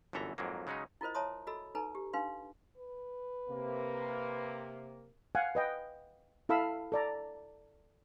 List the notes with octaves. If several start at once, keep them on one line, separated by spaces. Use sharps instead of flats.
G1 F#2 E3 A4 E5 A#5
F2 G#2 F#3 A#3
C#3 F#3 G#3 C#4 D#4
E4 F4 A#4 C5 D#5
C#5 E5 A5 A#5 C6 D#6
F#4 A4 D#5 B5 E6
D#4 A4 B4 A#5
G4
D4 D#4 B4 F5 C6
B4
C3 A#3
F5 F#5 G#5
B4 D#5 G5
E4 A4 F5 B5 E6
A4 D5 A#5